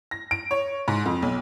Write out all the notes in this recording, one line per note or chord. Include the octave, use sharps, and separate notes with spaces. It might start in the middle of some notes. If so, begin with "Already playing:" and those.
A#6
D7
C#5
G#2
F2
B1